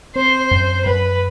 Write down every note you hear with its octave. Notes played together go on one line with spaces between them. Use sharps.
C4 C5
F#2
F#2 B4